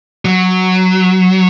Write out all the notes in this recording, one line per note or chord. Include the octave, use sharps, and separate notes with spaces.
F#3